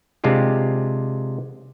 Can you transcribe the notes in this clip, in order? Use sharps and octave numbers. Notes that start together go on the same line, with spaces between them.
C3 G#3 D4 F4 G4